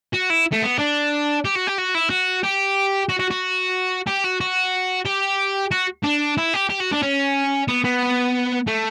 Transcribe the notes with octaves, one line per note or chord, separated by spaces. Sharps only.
F#4
E4
A3
B3
D4
G4
F#4
G4
F#4
E4
F#4
G4
F#4
F#4
F#4
G4
F#4
F#4
G4
F#4
D4
E4
G4
G4
F#4
D4
C#4
B3
B3
A3